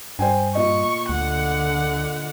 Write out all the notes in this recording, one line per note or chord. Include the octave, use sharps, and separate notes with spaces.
G2 C5 G5 G#5
A#2 D#5 C#6
D2 D3 F#5